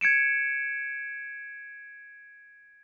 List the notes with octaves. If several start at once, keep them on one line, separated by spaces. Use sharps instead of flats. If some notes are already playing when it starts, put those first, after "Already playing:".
G#6 C#7 D7 E7